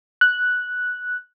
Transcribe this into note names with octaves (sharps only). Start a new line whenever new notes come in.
F#6